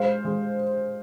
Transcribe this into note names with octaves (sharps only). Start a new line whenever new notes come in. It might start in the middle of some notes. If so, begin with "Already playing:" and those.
Already playing: G#3 C5 F5
G#3